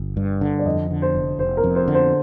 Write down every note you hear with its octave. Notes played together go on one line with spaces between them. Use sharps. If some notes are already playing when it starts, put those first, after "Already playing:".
Already playing: G1
G2
D3
D5
F2 D#5
D3
C5
F1
F1 C5
A#4
F2
C5
D3
C5